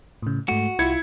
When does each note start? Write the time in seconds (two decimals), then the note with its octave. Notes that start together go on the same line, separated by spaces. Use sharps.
0.23 A2 C#3
0.48 G#2 A3 F#4
0.79 C2 E4 F4 G#6 C#7